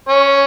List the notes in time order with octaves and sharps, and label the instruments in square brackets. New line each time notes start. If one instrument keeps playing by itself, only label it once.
[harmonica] C#4 C#5